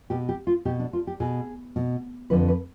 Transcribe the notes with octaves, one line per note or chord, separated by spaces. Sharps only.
B2 G4
G4
F4
B2 G4
D4
F4
G4
B2 G#4
B2
F2 D3 F3 B4
B4